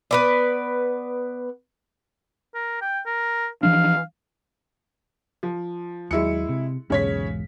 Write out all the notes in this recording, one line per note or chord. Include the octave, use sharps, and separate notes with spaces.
B3 B4 D5
A#4
G5
A#4
E3 F3 D4 F5
F3
D#2 F#3 G#3 E4 C#7
C3
B1 E2 G#2 C#3 C#5 B6